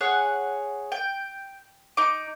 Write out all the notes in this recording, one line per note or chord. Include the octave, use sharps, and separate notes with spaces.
G#4 C#5 F#5
G5
D#4 D6